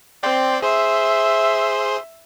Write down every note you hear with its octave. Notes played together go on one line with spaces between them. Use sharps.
C4 D5 G5 C6
G#4 C5 E5 C6